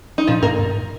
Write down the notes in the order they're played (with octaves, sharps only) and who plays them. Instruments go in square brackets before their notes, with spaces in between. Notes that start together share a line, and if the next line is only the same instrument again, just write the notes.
[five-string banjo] D#4
[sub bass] A#2 [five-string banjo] F3 F4
[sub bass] G#2 [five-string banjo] A#3 A#4
[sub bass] G#2